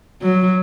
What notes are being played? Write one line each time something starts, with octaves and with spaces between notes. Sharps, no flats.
F#3